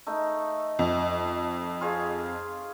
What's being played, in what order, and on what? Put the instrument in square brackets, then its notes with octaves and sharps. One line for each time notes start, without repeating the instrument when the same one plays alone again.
[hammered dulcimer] A3 D#4
[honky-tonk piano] F2
[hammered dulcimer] F4 G#4 C#5